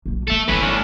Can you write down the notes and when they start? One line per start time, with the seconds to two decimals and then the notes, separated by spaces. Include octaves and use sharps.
0.06 A#1 F#2
0.28 F3 A3 A4 E5
0.48 G1 A2 D3 E3 B4
0.62 C#4 D4